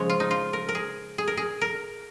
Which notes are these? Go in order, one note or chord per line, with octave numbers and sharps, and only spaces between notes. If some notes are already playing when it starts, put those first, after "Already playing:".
Already playing: C#3 F3 G#3 C#5
F4
D#4
F4
A#4
A#4
G#4
G#4
A#4
G#4
A#4